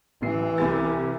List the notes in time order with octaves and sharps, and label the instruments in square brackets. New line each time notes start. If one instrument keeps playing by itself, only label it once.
[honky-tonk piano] A1 C7 [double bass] E3
[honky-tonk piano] C2 G#5 A6 [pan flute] G4